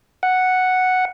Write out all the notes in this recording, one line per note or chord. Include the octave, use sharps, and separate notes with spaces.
F#5